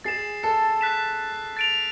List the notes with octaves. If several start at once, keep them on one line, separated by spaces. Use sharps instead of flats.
G#4 A6 C7 E7
A4
F#6 B6 E7
A6 D7 F7